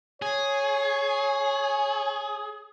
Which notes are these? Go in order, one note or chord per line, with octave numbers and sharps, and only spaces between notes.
G#4 C#5